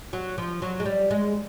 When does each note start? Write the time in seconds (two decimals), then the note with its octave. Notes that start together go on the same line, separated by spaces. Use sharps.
0.13 F#3
0.38 F3
0.62 F#3
0.80 G#3
0.86 G3
1.11 G#3